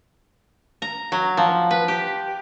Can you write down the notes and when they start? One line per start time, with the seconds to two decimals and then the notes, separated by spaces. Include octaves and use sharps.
0.82 A#5
1.12 F#3
1.37 F3
1.71 B4
1.88 G4